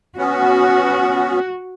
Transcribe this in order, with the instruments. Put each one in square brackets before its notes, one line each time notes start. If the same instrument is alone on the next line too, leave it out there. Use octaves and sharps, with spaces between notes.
[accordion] B3 C#4 [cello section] F#4